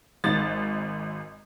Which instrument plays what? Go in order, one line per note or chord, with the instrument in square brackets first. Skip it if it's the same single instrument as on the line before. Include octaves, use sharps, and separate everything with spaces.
[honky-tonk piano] G#1 G#2 A6